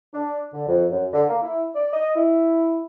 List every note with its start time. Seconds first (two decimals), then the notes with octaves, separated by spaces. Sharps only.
0.14 D4
0.54 D3
0.68 F2
0.92 F#2
1.13 D3
1.29 A#3
1.43 E4
1.75 D5
1.93 D#5
2.16 E4